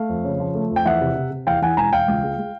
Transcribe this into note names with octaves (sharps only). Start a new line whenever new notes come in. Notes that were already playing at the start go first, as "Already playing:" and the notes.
Already playing: A3 F5
F2
C#3
F3
A3
F2
G5
E2 E5 F#5
C3
C3
C3
E2 F5 G5
E3 F#5 G#5
E1 G#5 A#5
E1 F5 G5
C#2
G#3
G#3